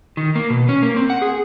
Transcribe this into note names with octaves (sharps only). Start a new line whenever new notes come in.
D#3
A#3
B2
C#4
A#3
C4
F#5
G#4